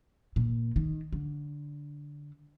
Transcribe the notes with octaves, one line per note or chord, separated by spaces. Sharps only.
A#2
D#3
D3